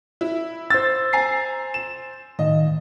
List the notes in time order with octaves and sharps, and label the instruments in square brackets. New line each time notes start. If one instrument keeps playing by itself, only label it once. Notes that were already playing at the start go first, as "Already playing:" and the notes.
[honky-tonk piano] E4
[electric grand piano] C5 A6 [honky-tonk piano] E6
[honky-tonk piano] G#5 A#5 C7
E7
[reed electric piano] A2 D#3 F5 [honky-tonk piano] D#5